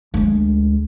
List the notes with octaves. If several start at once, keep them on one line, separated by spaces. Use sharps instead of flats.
D2 G#3